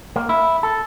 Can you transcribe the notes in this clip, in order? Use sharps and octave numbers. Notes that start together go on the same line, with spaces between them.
A#3
E4
A4